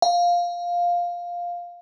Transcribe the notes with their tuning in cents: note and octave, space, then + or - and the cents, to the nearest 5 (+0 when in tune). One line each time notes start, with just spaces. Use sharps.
F5 +5